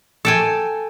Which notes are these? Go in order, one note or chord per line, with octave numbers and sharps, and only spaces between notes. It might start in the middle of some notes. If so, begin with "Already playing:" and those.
A4 G5 G#5